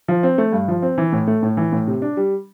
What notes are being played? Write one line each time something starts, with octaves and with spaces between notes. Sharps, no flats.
F3
C4
A3
G2
F3
C4
E3
A2
A3
A2
E3
A2
C3
D4
G3